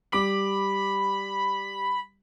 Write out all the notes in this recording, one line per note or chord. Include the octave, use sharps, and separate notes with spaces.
G3 B5 D6 F#7